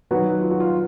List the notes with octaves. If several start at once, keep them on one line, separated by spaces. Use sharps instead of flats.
D#3 F#3 B3 F#4
F4
F#4
F4